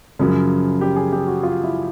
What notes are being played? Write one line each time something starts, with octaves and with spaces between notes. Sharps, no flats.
F#2 C#3 F3
G4
G#4
G4
F#4
F4
E4